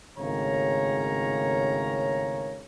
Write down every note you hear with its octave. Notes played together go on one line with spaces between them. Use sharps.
G#1 A2 C#3 A#4 C#5 A#5